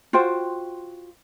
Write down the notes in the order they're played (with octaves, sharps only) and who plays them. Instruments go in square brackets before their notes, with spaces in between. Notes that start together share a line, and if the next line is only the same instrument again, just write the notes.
[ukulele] F4 F#4 C5 G5